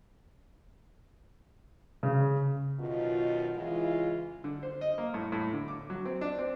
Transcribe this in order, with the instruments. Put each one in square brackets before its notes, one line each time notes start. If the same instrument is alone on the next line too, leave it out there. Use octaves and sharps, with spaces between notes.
[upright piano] C#3
[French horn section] F#2 B2 D#3 F4
C#3 E3 G#3 E4 F4
[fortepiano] D3
C5
D#5
A#3
A2
A2
D3
D6
F#3
C4
D4
C4